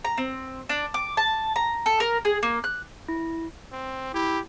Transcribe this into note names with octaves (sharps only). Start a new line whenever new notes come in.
A#5
C4
D4
D6
A5
A#5
A4
A#4
G#4
A#3
F#6
E4
C4
E4 G4